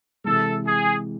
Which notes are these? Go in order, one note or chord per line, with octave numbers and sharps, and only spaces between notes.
C3 E3 G#3 A4
G#4